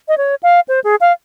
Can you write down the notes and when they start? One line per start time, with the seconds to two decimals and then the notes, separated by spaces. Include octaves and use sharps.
0.08 D#5
0.17 C#5
0.43 F5
0.68 C5
0.84 G#4
1.01 F5